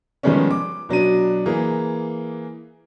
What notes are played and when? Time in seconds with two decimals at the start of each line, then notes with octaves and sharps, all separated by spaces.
0.23 D#3 F3 G3 G#3 B3 C#4
0.51 D6
0.89 B2 F#3 D4 D#7
1.46 E3 A#3 G#4